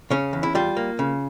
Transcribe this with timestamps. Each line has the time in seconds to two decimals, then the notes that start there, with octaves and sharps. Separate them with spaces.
0.11 C#3 C#4
0.33 E2
0.43 E4
0.55 G3 F4
0.77 A#3
0.99 C#3